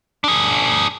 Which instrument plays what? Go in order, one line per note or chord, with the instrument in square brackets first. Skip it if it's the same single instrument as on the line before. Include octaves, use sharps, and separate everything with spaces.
[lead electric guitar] D4 G#4